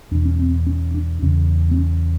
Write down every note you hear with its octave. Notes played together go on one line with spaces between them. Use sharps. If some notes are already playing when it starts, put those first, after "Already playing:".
E2 B2 D4
C#4
C4
C#4
D4
E2 C#3 C#4
C4
C#4